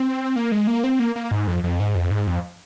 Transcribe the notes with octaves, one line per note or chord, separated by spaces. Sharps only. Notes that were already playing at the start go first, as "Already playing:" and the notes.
Already playing: C4
A#3
G#3
A#3
C4
A#3
A#3
G#2
F2
F2
G#2
F2
G#2
F2